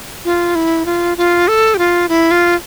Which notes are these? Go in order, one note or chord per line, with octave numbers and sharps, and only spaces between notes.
F4
E4
F4
F4
A4
G4
F4
E4
F4